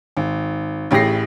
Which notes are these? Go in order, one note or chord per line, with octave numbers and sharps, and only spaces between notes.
G#1
A1 A2 G4 G#4 A#6 C7